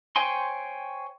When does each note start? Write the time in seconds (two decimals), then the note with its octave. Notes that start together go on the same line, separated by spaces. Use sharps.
0.16 C5 C#5 G5 G#5 C6